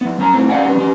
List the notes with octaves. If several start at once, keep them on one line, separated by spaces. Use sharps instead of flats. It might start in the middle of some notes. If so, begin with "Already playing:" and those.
F3 B3
F#3 C#4 A5 A#5
B1 A2 C4
C#4 D5 F5 F#5 G#5
G3 B3 C#4
F3 C#4 G4